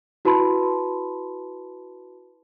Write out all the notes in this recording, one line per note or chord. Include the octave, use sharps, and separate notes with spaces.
E4 F#4 B4 A5 B5 C6